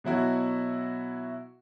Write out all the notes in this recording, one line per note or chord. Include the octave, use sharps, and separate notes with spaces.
B2 F#3 E4 F#4